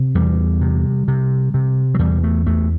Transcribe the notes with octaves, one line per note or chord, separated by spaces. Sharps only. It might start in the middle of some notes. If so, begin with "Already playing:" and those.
Already playing: C3
E2 G3
C3
C3
C3
F#3
E2 G3
A3
E2 A3